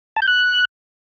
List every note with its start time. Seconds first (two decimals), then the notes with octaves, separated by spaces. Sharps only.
0.16 A5
0.22 G6
0.27 F#6